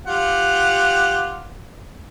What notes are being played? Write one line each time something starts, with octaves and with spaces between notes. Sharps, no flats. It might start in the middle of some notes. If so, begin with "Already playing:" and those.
F4 G4 F#5